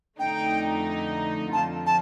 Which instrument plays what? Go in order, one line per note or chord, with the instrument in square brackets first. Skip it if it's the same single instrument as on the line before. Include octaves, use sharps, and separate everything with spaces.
[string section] F2 D3 A3 D#4 [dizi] G5
[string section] F2 D3 F3 C4 F4 [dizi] A5
[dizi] A5